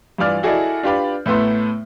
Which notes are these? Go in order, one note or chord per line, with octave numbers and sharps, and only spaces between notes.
G2 E3 F4 D5 F6
E4 F#4 G#4 A4 D5 D#5
D4 F4 G4 B4 D5 B5
A2 A3 B3 E5 C6